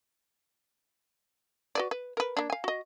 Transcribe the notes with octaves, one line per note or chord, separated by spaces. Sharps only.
F#4 B4 D5
B4
A#4 B4
A#3 D4
F5 G#5
F#4 D#5